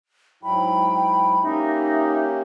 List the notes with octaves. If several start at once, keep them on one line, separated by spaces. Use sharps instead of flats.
G#2 F#3 E4 G5 B5
A#3 C#4 D#4 G4 E5